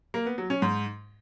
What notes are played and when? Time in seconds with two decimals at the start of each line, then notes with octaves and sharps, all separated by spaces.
0.14 A#3
0.26 B3
0.38 F#3
0.50 C#4
0.62 G#2